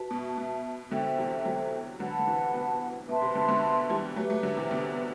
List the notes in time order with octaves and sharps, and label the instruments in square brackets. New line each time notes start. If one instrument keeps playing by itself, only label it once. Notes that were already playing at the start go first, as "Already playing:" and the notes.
Already playing: [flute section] F#4 B4 E5 A5
[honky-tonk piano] B2
B2
[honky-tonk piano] B2 D3 [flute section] A4 C5 E5 G5
[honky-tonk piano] C3 E3
D3 F#3
[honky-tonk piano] D3 F#3 [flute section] B4 F#5 A5
[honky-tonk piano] D3
C3 E3
B2 D3
[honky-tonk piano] B2 [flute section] B4 E5 A5 C6
[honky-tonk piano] C3
B2 D3
B2 D3
E3 G3
[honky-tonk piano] F#3 A3 [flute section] G4 B4 E5
[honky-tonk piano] F#3 A3
D3 F#3
C3 E3
B2 D3